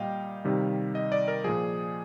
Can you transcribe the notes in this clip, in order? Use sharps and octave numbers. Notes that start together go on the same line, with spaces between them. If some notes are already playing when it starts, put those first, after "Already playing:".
Already playing: A#2 G3 D#5 F5 G5
C3 D#3 G3
D#5
D5
A#4
A#2 F3 G#4